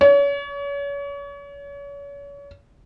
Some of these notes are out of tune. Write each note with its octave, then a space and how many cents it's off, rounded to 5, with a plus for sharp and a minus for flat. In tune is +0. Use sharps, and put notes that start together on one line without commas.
C#5 +35